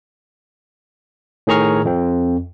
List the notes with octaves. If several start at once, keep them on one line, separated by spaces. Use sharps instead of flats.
A2 D#3 G#4 A#5 C#6 F6
F2 C4